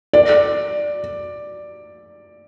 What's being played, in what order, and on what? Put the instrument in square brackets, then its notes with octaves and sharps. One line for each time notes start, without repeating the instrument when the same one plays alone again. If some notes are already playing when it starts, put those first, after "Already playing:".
[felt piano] D5